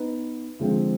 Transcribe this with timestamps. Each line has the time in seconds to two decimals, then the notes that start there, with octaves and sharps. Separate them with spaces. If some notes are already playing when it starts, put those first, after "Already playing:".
Already playing: B3 D#4 B4
0.59 D3 F3 G#3 C4 F4